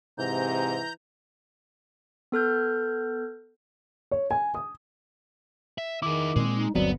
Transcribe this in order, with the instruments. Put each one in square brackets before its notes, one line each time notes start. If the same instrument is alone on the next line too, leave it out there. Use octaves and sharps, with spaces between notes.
[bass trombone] G#2 [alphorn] C3 [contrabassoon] E3 [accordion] A#5 G6
[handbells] B3 A4 F6 G6
[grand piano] C#5
G#5
D#6
[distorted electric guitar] E5
[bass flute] D#3 [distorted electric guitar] E4 G#4 [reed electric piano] D6
[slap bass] A#2 C4 [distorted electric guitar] G#3
[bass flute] D#4
[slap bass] G1 [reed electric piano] D#2 F#3 C4 [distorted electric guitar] B3 [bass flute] D5